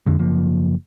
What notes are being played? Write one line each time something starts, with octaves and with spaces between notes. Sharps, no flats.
F2 D3 G#3
F#1 F3 A#3